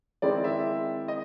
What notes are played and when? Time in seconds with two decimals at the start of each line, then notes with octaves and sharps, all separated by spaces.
0.22 D#3 G#3 C4 E4 D5
0.44 E5
1.08 D#5